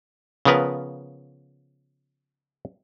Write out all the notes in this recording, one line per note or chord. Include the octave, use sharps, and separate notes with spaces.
C#3 F3 B3 A#4 B4